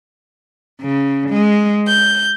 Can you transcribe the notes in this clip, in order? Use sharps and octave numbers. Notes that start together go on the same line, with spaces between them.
C#3
G#3
G6